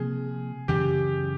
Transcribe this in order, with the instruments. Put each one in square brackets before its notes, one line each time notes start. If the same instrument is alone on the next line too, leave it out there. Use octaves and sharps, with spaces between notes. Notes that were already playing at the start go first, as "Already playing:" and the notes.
Already playing: [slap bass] C3 F3 A#3 [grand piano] G#4
[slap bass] F#2 C#3 E3 [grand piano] G4